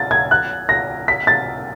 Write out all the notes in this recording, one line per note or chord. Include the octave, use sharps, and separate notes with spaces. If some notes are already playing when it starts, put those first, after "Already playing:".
Already playing: A6
G#6
F#6
A#6
B6
A6